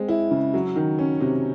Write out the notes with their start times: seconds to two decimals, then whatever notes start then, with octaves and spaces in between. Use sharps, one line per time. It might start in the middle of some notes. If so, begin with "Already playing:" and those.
Already playing: G#3 C4
0.09 E4
0.31 C#3
0.54 F#3
0.76 D#3
0.99 C#4
1.21 C3